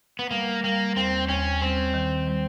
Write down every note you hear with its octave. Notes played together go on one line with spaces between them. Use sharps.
B3
G3 A#3
G3 A#3
D#2 C4
D#2 C#4
G3 C4
D#3
G3